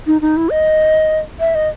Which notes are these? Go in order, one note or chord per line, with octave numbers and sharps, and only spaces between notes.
D#4
D#4
E4
D#5
E5
D#5